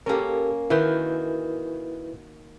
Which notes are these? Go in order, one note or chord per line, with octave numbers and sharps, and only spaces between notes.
A#3 C#4 G4 A4 A#4
D#3 E4 F#4 B4 G6